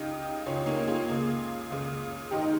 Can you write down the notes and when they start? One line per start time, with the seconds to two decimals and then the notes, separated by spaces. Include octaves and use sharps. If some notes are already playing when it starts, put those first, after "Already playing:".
Already playing: C#2 C#3 D#4 G4
0.46 C#2 C#3 C#4 F4
0.66 A#3 C#4
0.87 F4 G#4
1.08 C#2 C#3
1.70 C#2 C#3
2.31 G#2 D#3 D#4 G4
2.42 D#4